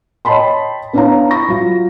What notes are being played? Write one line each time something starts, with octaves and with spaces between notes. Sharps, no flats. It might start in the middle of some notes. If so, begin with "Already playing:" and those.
C#5 D#5 G5 A5 B5 C6
B3 D4 E4 C#5 F5 A#5
B5 C#6 A#6
F#3 F4